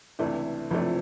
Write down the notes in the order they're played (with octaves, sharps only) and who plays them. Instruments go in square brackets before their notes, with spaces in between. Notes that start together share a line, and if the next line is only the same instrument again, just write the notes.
[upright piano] C#2 C3 E3 A3 D4
[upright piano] C#2 C3 E3 A3 D4 [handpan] F3